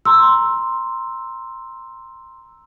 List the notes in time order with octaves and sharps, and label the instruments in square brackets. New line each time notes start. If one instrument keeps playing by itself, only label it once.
[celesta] A#5 C6 E6